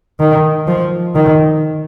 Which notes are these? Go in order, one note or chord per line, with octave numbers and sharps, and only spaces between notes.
D#3
F3
D#3